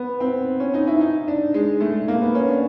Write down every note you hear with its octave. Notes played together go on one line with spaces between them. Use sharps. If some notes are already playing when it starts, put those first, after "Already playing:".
Already playing: B3
C4
C#4
D#4
E4
D#4
D4
G#3
A3
A#3
B3
C#4
D4